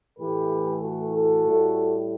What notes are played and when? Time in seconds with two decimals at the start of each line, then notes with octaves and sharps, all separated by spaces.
0.18 A2 E3 A3 G4 B4
0.82 F#4 A4
1.13 F#4 A4
1.46 A2 G3